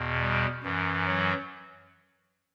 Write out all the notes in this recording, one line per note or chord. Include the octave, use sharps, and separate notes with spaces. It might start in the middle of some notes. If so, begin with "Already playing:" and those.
Already playing: E2 B2
G3
F#2 E3
F#3